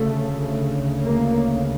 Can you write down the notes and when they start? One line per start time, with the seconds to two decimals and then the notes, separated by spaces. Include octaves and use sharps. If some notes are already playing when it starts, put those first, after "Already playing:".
Already playing: D2 C#3 A3
1.04 A#3